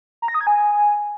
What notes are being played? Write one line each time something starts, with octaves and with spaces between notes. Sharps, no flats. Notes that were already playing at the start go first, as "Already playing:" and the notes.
A#5
A#6
D#6
G#6
G#5